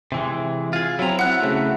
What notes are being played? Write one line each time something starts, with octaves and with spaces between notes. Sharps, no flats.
C3 E3 G#3
F4 G#4
F#3 C4 E4 A#5
F#5 F#6
C#3 A3